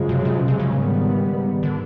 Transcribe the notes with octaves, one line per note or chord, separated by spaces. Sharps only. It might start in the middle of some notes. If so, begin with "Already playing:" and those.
Already playing: F#2 C#3 F3 G#3
C3
C3
B2
C3
C#3
G#2 D#3 G3 B3
D3